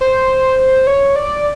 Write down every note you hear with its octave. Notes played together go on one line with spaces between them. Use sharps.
C5
C#5
D5